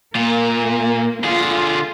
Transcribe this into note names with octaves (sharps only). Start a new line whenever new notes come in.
A#2 A#3 F4
D3 F4 G#4